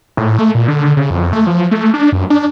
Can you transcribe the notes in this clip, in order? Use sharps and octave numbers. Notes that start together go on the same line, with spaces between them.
A2
A3
A#2
D3
C#3
F2
A3
F3
A3
D4
F#2
D4